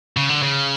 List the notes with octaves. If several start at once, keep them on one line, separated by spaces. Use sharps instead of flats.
C#3
D3
C#3